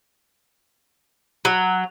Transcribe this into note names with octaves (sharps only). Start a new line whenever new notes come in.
F#3